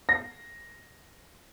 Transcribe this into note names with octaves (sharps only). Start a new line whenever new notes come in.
A#6